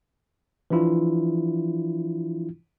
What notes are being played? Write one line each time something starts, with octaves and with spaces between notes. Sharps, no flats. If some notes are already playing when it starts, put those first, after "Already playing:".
E3 F3 D4 E4 F4